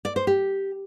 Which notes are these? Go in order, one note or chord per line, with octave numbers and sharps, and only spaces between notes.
D5
C5
G4